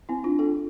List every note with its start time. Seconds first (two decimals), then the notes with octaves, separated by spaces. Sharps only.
0.09 C4 E4
0.24 D4 F4
0.39 F4 A4